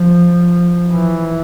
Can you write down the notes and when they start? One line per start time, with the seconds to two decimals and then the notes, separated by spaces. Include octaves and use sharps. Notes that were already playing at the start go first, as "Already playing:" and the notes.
Already playing: F3
0.92 E3